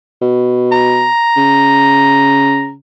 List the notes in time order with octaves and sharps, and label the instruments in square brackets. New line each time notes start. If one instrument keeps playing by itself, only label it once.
[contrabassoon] B2
[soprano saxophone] A#5
[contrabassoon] C#3